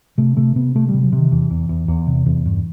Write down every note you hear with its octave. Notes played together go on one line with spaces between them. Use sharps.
C3 A3
C3 A3
C3 B3
C3 A3
G3
C3
F#3
C3
D#3
E2 E3
E2
E2
E2
C3
E2
G2